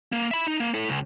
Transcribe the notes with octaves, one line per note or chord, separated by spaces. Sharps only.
A#3
E5 B5
D#4
A#3
E4 A4
C#2